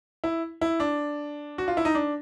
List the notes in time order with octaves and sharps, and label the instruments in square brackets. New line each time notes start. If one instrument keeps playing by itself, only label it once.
[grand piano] E4
E4
D4
F#4
F4
E4
D#4
D4